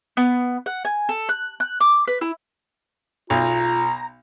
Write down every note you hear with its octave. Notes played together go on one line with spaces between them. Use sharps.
B3
F#5
G#5
A4
F#6
F#6
D6
B4
E4
B1 F4 A#5